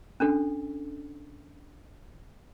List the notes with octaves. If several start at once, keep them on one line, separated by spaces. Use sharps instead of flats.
C#4 D4 A4